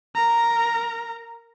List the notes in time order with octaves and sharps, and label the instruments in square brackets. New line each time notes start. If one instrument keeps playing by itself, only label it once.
[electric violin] A#4 A#5